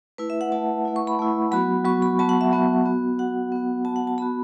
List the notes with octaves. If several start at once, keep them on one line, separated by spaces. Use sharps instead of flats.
A3 E4 B4
E5
F#5
A3 E4 A5
A3 E4
C#6
B5
A3 E4
F#3 B3 F#4 B5
F#3 B3 F#4 C#6
B5
F#3 B3 F#4 A5
F#5
E5
F#3 B3 F#4
B3 F#4
B3 F#4 F#5
B3 F#4
B3 F#4 A5
F#5
A5
B3 F#4 B5